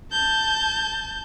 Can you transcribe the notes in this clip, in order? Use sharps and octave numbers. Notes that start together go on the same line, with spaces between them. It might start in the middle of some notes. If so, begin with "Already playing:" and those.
A5 G6